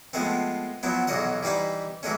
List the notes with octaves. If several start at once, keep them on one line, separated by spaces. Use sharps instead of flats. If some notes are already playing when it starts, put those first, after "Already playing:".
F3 G#3 A3 B3 C4
F3 F#3 B3 E4
B1 E2 B2 F#3 D#5 F#5
E3 G3 D#4 C5 B5
E3 F#3 G#3 A3 C#4